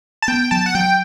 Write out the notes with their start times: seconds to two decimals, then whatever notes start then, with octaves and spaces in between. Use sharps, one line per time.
0.22 A5
0.28 B3 G5
0.51 F#3 A5
0.66 F#5
0.75 F#3 G5